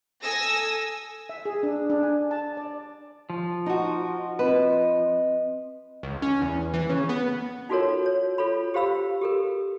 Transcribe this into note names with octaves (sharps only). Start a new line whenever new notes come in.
A4 G#5 D#6 E6 A#6
E5
G#4
D4
D4
G#5
A5
D5
F3
D#4 F#4
C4 B4 D#5
C#2
C#4
E2
E3
C#3
B3
D#4 F4 F#4 A4 A#4 C#5
C#5
F4 A4 C#5 B5
G4 C5 F5 B5 E6
G4 A4 A#4